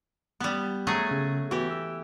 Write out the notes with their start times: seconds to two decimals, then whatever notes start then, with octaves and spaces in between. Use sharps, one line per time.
0.40 G3 B3
0.87 F#3 A3 G#4
1.11 C#3
1.51 E3 B3 F#4 G4
1.71 E6